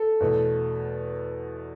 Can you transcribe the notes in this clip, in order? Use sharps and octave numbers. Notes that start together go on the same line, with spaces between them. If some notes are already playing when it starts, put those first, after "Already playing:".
Already playing: A4
E2 B2 A3